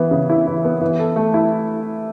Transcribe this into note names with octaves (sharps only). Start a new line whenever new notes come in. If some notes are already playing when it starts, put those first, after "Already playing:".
Already playing: E3 B3
C#3
E4
E3
B3
E3
A4
A3
E4